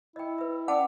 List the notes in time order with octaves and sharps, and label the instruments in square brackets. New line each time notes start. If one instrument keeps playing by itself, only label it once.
[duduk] E4 [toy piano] D#5 G5
[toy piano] B4 E5
[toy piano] C#4 G5 A5 [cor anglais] D5 [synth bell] F#5